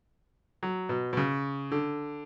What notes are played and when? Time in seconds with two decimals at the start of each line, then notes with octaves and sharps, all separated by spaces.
0.63 F#3
0.89 B2
1.13 B2
1.17 C#3
1.71 D3